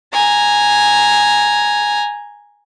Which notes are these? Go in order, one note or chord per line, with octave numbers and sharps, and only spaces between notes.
G#5 A#5